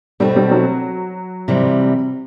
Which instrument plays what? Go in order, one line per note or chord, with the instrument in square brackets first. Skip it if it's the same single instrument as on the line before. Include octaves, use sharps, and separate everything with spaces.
[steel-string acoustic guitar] B2 A3 C4 [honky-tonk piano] G3
[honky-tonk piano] G3
F#3
[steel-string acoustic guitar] C3 E3 G3